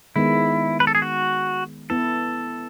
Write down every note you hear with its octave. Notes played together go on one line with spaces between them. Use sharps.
D#3 G#3 B3 E4
B4
A4
G#4
F#4
B3 E4 A4 B4